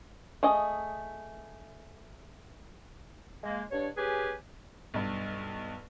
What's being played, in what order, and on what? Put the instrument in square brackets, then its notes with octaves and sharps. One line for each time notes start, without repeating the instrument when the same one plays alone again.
[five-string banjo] A3 G#4 D#5
[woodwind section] G#3 A#3
G2 D4 C#5
C#4 G4 G#4 B4 G#5
[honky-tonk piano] B1 G2